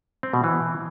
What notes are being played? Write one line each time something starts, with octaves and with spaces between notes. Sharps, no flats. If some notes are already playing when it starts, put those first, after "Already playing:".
C4
B2
E3